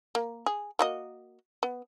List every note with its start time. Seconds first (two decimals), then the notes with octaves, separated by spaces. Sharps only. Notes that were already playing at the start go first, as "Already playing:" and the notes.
0.15 A#3
0.46 G#4
0.79 A#3 F#4 D#5
1.63 B3